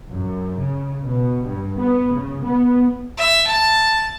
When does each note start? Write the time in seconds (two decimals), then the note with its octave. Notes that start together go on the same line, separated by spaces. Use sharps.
0.11 F#2
0.59 C#3
1.04 B2
1.45 G2
1.78 B3
2.13 C#3
2.44 B3
3.18 E5
3.47 A5